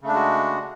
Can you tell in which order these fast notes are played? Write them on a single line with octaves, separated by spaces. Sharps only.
C#3 A3 D4 G#3 F#4